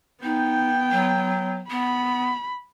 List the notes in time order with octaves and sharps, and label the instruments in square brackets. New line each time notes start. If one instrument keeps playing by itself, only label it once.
[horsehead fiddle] B3 G5 [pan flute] D#4
[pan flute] F#3
[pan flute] B3 [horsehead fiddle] B5